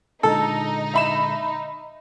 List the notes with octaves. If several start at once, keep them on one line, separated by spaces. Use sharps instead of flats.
A#2 D3 G#3 D#4 A4
E5 B5 E7